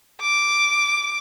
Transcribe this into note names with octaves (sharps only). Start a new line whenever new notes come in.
D6